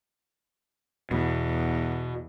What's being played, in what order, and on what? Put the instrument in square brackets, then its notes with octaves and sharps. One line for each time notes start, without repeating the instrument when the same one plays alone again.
[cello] E2 [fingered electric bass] B2